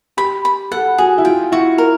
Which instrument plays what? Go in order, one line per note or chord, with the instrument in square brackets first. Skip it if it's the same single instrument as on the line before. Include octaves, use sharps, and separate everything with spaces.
[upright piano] G4 [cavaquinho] B5
[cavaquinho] B5
[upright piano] A4 [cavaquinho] F#5
[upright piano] F#4 [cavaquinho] G#4
[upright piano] E4
[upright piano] F4 [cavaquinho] G5
[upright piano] E4 [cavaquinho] F#4
[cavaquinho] A#4